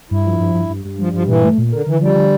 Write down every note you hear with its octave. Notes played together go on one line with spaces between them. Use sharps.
G2 E4
F3
G2
G2
G2
G2
F3 G3
G2 F3
A#2 E3
A3
A#2
D3 A#4
D3 E3
F3 G3
D3